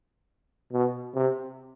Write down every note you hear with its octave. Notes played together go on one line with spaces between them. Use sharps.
B2
C3